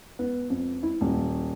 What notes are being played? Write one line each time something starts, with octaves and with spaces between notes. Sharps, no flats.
B3
F2
E4
D#1